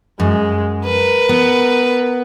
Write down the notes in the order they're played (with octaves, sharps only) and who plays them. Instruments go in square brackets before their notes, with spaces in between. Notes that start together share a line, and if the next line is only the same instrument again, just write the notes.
[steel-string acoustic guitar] F#2 [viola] G#3
[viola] A#4 [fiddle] B4
[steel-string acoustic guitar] B3